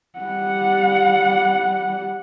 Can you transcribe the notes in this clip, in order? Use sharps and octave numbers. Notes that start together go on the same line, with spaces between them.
G3 F#5